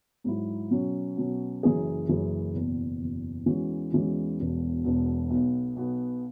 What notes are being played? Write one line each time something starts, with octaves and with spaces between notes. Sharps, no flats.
G#2 F#3 E4
B2 F#3 C#4
B2 F#3 C#4
F#1 F#2 E3 C#4 G#4
F#1 F#2 E3 C#4 G#4
F#1 E2 B2
F#1 E2 B2
E2 E3 G#3 C#4 F#4
E2 E3 G#3 C#4 F#4
E1 E2 B2
E1 E2 B2
B1 B2 B3
B1 B2 B3